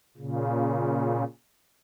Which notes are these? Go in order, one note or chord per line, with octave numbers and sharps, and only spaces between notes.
A#2 C#3